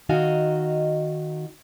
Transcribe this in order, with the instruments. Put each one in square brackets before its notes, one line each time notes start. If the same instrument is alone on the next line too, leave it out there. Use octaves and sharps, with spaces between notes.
[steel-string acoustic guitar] D#3 D#4 F#4 D#5 F5 G#5